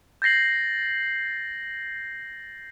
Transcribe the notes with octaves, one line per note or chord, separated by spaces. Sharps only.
G6 A6 A#6 C7 F#7